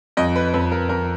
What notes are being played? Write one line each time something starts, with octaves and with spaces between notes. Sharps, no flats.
F2 D#5
B4
F2 B4
A#4
F2 A#4